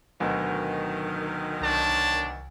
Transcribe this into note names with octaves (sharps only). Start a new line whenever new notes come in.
D2 B2 D#3 F#3
C2 D4 C#5 A5